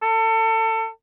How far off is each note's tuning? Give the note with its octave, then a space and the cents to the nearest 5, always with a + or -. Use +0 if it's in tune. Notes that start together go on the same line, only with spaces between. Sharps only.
A4 +30